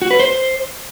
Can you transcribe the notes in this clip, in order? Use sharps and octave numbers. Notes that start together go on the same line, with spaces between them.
F#4
B4
C5